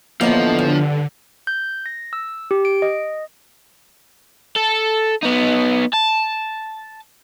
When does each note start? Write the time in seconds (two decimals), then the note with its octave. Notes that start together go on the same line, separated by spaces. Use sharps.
0.21 A2 D3 E3 F3 A#3 B3 D#5 A5
0.59 G2
1.47 G6
1.86 A#6
2.13 E6
2.51 G4
2.65 D7
2.82 D#5
4.56 A4
5.23 B3 D#4
5.94 A5